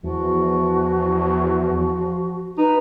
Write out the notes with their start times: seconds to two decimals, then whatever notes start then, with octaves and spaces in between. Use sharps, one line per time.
0.03 E2 F3 F#4
2.58 D#4 B4